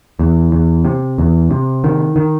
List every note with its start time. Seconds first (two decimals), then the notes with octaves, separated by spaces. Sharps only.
0.19 E2
0.52 E2
0.85 C3
1.18 E2
1.51 C3
1.84 D#3
2.16 D#3